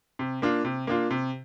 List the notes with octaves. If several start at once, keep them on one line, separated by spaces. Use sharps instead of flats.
C3
A#3 D4 F4
C3
A#3 D4 F4
C3